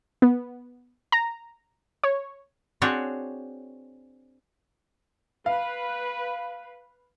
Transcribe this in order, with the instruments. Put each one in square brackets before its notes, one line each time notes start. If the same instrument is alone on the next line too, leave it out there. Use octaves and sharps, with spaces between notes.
[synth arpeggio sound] B3
A#5
C#5
[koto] C4 D4 F#4 G#4 C#5
[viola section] B4 [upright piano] F5